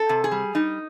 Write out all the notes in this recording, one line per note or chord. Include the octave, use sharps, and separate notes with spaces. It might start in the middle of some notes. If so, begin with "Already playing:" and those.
Already playing: A4
C3
G#4
G3
G3 D#4